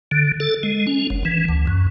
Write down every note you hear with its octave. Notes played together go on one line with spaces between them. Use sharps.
D3
A4
G#3
C#4
F#1
E3
D2
F#2